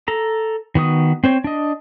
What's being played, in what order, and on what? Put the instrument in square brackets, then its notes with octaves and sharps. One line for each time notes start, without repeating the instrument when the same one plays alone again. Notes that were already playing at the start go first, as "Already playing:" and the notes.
[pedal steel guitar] A4 A#5
D#3 B3 F#4 D#6
C4 C5 C#5
D4 D#5